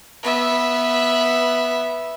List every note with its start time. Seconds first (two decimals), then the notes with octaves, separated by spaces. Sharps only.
0.23 B3 E5